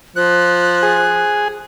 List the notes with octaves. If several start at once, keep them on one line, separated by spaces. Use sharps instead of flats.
F3 F#6
G#4